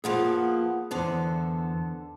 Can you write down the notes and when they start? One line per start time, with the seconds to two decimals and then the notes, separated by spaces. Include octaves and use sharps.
0.04 F3 A#3 B3 G#4 F#5
0.91 E2 D3 B3 A4 C5